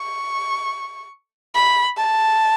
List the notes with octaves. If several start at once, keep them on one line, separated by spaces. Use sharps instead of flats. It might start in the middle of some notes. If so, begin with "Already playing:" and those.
Already playing: C#6
B5
A5